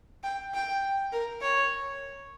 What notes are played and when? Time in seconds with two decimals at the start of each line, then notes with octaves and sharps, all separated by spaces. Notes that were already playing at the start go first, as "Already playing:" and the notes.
0.24 G5
0.54 G5
1.13 A#4
1.42 C#5